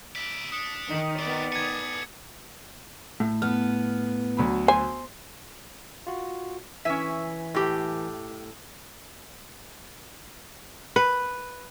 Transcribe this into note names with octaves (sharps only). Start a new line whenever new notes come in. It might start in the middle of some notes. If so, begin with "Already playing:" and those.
E4 D5 B6 D7
D4 D#6 C#7
D#3 D#4
B3 C4 F#4 D5
A4 G#5 G#6 C#7
A2
B3 F6
D2 F#3 B5
C5 G#5
F4 F#4
E3 C#4 E5 G#5 B6
A2 G4
B4